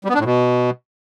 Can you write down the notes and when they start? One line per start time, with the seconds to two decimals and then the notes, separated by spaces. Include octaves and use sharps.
0.04 G3
0.09 B3
0.15 D4
0.20 A2
0.25 B2